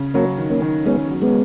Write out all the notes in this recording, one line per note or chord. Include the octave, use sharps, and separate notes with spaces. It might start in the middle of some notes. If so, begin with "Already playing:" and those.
Already playing: C#3
F#3 A#3 C#4
D#3
A#3 C#4
D#3
G#3 B3 C#4
F#3
G#3 B3